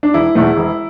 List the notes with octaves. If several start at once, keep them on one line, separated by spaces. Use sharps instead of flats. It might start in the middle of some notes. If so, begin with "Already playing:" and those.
D4
E1 E4
E2 B2 A3
E1